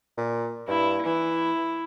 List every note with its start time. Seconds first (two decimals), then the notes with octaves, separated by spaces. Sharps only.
0.18 A#2
0.68 G2 E4
1.06 E3 E4